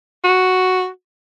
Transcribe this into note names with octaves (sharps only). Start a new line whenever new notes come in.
F#4